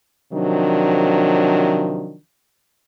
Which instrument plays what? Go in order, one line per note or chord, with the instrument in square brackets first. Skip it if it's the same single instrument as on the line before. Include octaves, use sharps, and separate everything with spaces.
[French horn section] C3 D#3 F3 F#3 D4